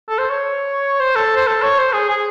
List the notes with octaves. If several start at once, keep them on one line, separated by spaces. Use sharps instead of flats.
A4
C5
C#5
C5
A4
C5
A4
C#5
C5
G#4
G#4